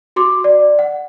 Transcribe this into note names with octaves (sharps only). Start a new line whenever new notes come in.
F#4 C6 D6
D5
F#5